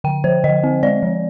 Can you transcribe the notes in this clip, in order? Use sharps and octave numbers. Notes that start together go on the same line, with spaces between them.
D3 G5
F3 C5
D3 D#5
C4
G#3 D5
F3